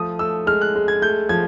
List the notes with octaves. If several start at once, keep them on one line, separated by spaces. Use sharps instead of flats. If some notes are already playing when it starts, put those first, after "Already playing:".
Already playing: F3 A3 D#6
A3 E6
G#3 F6
F#6
G#3
G#6
A3 G6
F3 G#6